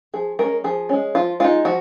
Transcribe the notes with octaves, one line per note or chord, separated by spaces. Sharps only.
F3 G#4
G#3 C#4 A#4
F3 G#4
G#3 C#4
F3 F4
G#3 D#4 F4
F3 F#4